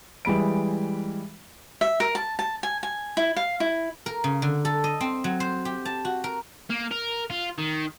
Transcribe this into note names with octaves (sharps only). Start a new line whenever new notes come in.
E3 G3 G#3 B5 D7
E5
A#4
A5
A5
G#5
G#5
E4
F5
E4
A#4
C#3
D3
A4
D#5
C4
F#3
C5
G4
A5
F#4
A#4
A#3
A#4
F4
D#3